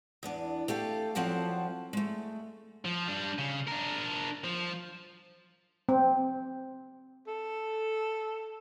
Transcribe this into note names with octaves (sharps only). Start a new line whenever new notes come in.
E2 B3 D4
A3 G4 A4 F5
E2 F3 F#3 C4 F#5 A5
G#3 A3
F3
G3 D4
C#3
D4 A#4
F3
C4
A4